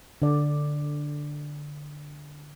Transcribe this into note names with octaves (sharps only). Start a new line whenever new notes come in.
D3 D5